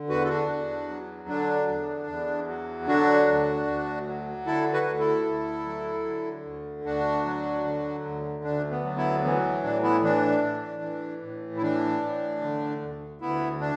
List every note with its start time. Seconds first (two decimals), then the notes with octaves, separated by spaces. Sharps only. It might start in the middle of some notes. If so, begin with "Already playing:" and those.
Already playing: D3
0.09 E2 F#4 B4
0.24 A4
0.29 D4 F#4
0.49 E2
0.88 F#3
1.29 D3 D4
1.68 E2
2.08 E2
2.47 F#3
2.87 D3 D4 F#4
3.27 D2
3.67 D2
4.07 F#3
4.46 D3 E4 A4
4.73 F#4 B4
4.86 D2
4.99 E4 A4
5.26 D2
5.65 F#3
6.06 D3
6.45 D2
6.84 D2 D4 F#4
7.25 F#3
7.65 D3
8.05 D2
8.44 D2 D4
8.71 B3
8.84 F#3
8.96 B3 E4
9.24 E3 B3
9.63 A2 D4
9.83 B3 E4
10.03 E3 D4
10.43 A2
10.82 E3
11.22 A2
11.57 E4
11.62 E3 D4
12.02 A2
12.41 D3
12.82 D2
13.21 D2 B3 E4
13.61 D4